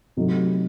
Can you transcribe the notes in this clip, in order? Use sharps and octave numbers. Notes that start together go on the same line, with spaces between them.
C3 F#3 A3 D#4 A4